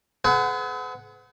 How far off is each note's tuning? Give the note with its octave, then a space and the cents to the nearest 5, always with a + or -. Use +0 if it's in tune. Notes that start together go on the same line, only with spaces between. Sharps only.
G#4 +45 B4 +45 F#5 +0